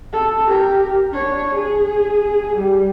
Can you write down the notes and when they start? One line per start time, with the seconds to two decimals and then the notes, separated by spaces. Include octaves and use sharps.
0.13 A4
0.47 G4 A#4
1.11 D4 C#5
1.55 G#4
2.56 G3